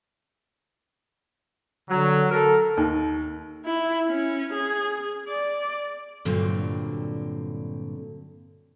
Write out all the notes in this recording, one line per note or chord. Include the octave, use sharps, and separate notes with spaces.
D3 F#3
A4 A#4
D#2
E4
C#4
G#4
D5
G2 A#2 D3 F#3 C4